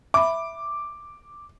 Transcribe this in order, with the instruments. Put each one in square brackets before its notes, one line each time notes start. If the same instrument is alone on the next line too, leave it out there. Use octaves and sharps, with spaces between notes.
[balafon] E5 B5 [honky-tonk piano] D6